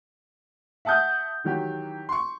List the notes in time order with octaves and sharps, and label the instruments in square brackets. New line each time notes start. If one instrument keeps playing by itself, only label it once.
[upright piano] E5 F#5 A5 D#6 G6
D#3 E3 F#3 G4
C6 C#6